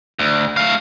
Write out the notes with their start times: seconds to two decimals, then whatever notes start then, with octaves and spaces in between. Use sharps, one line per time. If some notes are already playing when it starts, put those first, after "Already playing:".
0.19 D2
0.57 A3 F5